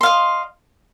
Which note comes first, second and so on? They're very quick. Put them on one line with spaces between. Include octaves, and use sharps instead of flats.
C6 F5 D#5